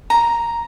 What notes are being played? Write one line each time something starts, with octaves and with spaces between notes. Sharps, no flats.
A#5